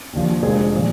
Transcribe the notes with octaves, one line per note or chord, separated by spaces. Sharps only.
D#2 D3 F3
F1 F2 D3 G#3 G#4
A#2 F3